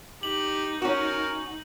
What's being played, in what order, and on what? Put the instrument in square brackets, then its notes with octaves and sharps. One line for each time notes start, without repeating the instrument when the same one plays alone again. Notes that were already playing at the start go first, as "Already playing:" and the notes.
[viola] D#4 [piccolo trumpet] G4 [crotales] F#7
[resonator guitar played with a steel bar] C#4 F#4 [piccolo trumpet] A#4